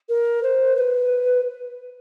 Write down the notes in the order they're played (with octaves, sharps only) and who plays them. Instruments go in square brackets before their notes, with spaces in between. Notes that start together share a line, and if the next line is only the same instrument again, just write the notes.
[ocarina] A#4
C5
B4